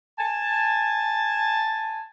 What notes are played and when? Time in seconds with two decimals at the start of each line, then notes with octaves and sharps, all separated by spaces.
0.19 G#5 A5